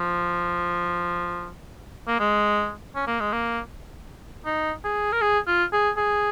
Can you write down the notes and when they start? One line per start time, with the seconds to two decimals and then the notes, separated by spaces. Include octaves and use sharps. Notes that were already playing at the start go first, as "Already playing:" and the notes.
Already playing: F3
2.08 A#3
2.20 G#3
2.95 C#4
3.07 A#3
3.20 G#3
3.32 A#3
4.46 D#4
4.84 G#4
5.12 A#4
5.21 G#4
5.47 F4
5.73 G#4
5.97 G#4